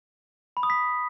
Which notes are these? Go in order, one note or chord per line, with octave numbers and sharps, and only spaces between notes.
B5
D#6
B6